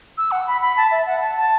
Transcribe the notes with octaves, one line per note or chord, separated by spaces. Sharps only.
E6
F#5
B5
B5
A5
E5
F#5
A5
A5